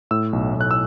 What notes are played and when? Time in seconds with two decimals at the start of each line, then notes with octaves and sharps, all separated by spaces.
0.11 A2 E6
0.33 B1
0.55 B1
0.61 F#6
0.71 E6